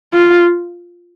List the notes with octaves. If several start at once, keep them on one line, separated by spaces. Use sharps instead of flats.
F4